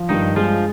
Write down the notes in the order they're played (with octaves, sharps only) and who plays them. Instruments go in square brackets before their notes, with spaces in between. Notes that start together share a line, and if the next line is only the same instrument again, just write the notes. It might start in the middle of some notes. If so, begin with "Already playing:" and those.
Already playing: [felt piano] F3
[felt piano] G2 [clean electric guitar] D#3 D#4
[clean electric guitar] F3 F4 [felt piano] G#3